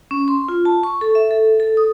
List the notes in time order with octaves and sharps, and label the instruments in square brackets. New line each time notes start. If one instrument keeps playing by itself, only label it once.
[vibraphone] C#4
C6
F4
A5
C#6
A4
E5
A4
A4
D#6